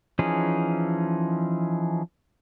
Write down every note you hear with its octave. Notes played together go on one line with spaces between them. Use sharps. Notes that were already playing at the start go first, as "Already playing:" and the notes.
E3 F3 C#4 D#4 G#4